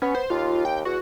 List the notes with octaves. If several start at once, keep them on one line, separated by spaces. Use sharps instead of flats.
B3 C#4
C5
D#2 F4
G5
E2 F#4